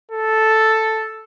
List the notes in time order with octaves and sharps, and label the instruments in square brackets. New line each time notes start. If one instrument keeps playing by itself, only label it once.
[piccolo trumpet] A4